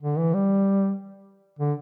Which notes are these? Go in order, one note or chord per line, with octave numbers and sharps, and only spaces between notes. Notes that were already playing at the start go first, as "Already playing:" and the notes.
D3
E3
G3
D3